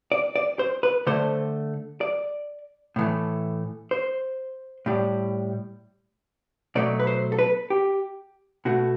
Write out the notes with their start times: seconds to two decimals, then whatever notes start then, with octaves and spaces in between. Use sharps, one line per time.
0.12 D5
0.36 D5
0.59 C5
0.83 B4
1.07 D3 A3 C5
2.01 D5
2.96 A2 E3 A3
3.91 C5
4.86 A2 G3
6.75 B2 F#3 A3 D5
7.00 B4
7.07 C5
7.32 A4
7.39 B4
7.70 G4
8.65 B2 A3 F#4